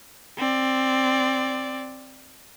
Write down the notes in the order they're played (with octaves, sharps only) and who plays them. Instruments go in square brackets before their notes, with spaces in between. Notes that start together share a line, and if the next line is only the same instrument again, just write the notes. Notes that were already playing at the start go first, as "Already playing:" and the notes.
[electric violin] C4 D5